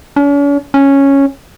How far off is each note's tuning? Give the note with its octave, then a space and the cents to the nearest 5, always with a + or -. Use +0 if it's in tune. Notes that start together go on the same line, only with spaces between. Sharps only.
C#4 +45
C#4 -5